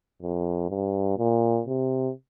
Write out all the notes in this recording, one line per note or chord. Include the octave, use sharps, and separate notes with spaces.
F2
G2
A#2
C3